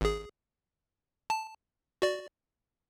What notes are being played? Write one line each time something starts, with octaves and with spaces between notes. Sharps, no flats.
G#1 G#4
A5
F#4 D5